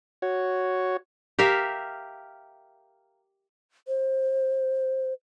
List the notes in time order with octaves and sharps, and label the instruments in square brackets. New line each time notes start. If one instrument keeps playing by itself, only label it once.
[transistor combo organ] F#4 C#5
[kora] G4 A#4 E5 F5
[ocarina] C5